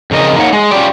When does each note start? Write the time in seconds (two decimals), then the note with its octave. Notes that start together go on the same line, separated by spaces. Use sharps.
0.11 F2 C#3 A#4 D#5
0.36 A#3 D#4 A#4 B4 C#5 F#5
0.53 G#3
0.71 C#4 F4 G4 D5